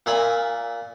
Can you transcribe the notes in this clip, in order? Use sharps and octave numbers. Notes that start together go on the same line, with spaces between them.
A#2 A#4 E5 G#5 B5